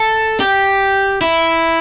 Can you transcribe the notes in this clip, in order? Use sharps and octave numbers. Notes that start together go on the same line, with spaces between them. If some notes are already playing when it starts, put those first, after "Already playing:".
Already playing: A4
G4
E4